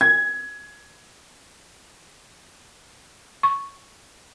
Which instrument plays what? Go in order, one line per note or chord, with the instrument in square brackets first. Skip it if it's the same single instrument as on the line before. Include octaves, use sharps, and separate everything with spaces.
[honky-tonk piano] G#6
[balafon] C#6